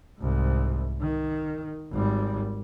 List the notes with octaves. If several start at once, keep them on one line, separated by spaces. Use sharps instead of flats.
C2 G#2
D#3
G#1 G3